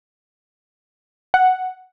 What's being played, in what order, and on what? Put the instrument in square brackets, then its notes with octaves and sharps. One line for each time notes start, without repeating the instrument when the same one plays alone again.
[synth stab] F#5